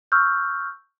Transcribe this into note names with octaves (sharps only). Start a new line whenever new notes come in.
C#6 E6 F6 G6